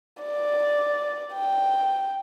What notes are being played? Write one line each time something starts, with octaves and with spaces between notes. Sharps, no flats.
D5
G5